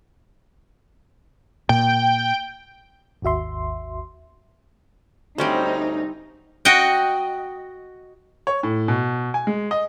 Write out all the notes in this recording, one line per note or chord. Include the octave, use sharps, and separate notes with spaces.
A#2 G5
G#1 D#2 F#4 E5 C6
D2 G3 C4 C#4 D#4 C5 G5
F#4 D#5 F#5 G5
C#5
A2
B2
G#5
G#3
D#5